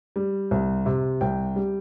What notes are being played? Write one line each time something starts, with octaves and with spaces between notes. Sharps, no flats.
G3
C2
C3
C2 G5
G3